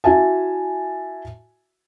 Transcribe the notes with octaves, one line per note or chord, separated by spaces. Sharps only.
E4 F#4 E5 G#5 A5